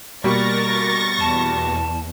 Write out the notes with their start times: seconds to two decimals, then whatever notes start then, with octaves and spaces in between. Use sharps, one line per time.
0.24 B2 G3 A#3 A#4 C#6 A6 A#6
1.20 E2 A5